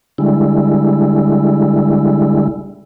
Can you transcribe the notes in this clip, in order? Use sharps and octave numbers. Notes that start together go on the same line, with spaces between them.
D3 G3 G#3 E4